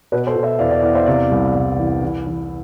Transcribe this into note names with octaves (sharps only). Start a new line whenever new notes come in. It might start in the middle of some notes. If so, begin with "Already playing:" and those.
B2 B4
A4 C5
B2
C5 E5
E2 D5 F5
D5 F5
E2 D5 F5
C5 E5
C3 D5 F5
C2
C2
E3
E3
E3